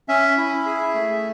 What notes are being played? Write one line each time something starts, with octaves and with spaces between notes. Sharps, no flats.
C#4 E5
E4
G#4
A3